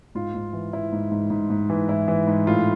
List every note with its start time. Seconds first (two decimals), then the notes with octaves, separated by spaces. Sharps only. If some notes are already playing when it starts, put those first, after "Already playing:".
0.15 G#2 F4
0.34 G#2
0.53 E3
0.73 E3 E4
0.92 G#2
1.12 G#2
1.30 G#2
1.50 G#2
1.70 E3
1.89 G#2 E4
2.08 E3
2.27 G#2
2.47 A2 F4